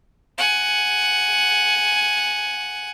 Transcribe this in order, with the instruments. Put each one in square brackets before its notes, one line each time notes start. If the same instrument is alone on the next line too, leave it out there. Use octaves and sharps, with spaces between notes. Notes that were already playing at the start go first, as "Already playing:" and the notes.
[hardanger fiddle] F#5 G#5